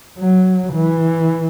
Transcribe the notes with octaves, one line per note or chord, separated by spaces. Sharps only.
F#3
E3